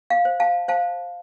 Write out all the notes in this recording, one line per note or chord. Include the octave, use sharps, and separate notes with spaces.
F5
C5
F5 A5
C5 F5 A5